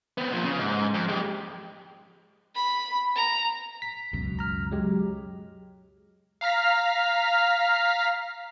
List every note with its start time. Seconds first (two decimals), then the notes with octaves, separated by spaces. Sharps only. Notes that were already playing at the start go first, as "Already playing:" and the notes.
0.18 B3 C4
0.31 A#2 F3
0.44 C#3
0.59 G#2
0.94 F2
1.09 G#3 G4
2.56 B5
3.16 A#5
3.82 B6
4.13 C#2 F#2 B2
4.39 A#5 F6
4.72 F#3 G#3 G4
6.41 F5 A#5 F6 B6